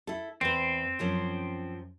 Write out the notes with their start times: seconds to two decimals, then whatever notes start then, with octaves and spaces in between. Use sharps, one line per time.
0.07 E4 A4
0.41 E2 C4 B4
0.99 F#2 F3 C#4